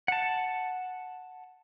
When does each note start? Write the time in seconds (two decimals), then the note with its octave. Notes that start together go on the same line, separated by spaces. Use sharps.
0.08 F#5 A5